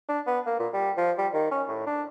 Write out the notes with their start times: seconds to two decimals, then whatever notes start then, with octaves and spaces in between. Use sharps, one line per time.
0.09 D4
0.27 B3
0.46 A#3
0.59 A#2
0.73 G3
0.98 F3
1.18 G3
1.33 D#3
1.51 C#4
1.69 A2
1.87 D4